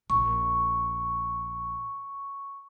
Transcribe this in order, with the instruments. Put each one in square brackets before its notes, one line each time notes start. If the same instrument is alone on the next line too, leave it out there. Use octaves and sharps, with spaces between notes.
[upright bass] A#1 [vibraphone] C#6